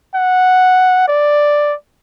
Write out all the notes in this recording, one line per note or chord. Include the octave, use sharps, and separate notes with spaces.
F#5
D5